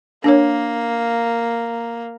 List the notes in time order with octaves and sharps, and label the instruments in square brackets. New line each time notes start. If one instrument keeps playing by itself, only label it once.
[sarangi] A#3 [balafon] D4 A#4 C#5